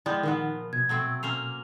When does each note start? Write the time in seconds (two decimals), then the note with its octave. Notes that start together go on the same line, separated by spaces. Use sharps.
0.06 F3 G#3 B3 E4 D5 G5 G6
0.23 A#2 D#3 F3 B3 A#4 F#5
0.73 B2 G#6
0.89 F#3 A3 C4
1.23 A#3 C#4 C5 F7